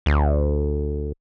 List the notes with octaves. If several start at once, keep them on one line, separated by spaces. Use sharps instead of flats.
D2